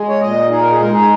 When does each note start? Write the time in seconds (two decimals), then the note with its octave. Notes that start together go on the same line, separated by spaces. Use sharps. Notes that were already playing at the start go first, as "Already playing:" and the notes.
Already playing: G#3
0.09 C#5
0.21 A#2 D#5
0.50 D#4 G#4
0.62 A#4
0.71 G#4
0.80 G#3 A#4
0.92 G#4